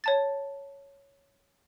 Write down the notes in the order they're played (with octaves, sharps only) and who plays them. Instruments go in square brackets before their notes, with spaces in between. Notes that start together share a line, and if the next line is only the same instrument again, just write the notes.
[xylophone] C#5 A5 A6